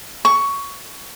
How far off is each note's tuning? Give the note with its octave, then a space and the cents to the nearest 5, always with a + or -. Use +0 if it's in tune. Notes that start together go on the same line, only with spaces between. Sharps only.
C#6 +15